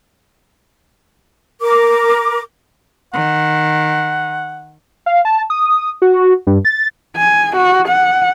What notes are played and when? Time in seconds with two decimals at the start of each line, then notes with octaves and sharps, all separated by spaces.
1.61 A#4 D6
3.14 D#3 F#5
5.06 F5
5.25 A5
5.50 D#6
6.02 F#4
6.47 G2
6.65 A6
7.17 G#5
7.56 F#4
7.88 F#5